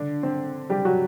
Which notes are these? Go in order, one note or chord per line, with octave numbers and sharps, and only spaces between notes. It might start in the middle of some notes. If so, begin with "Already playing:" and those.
Already playing: D3 D4
C4
G3 G4
F#3 F#4